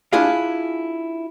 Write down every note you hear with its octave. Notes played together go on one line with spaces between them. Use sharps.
D4 E4 F4 G#4 F5